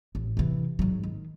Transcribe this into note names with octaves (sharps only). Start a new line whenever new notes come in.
A1
C3 E3
G#2 F#3
D#3